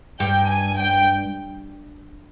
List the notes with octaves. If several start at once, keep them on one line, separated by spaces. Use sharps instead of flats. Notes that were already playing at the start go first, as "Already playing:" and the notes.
G2 G5
G#5
G5